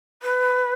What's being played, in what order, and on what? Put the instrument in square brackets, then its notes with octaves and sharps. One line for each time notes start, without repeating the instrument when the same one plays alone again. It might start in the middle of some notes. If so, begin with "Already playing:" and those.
[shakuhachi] B4